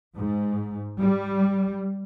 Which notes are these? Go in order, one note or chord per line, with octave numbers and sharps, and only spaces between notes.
G#2
G3